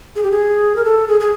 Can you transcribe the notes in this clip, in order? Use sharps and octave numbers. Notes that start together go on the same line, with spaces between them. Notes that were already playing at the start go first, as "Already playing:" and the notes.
G#4
G4
G#4
A#4
A4
G#4
G#4